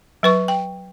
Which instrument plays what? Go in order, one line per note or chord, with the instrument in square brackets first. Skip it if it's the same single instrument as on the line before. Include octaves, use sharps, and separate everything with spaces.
[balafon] F#3 B4 C#6
G5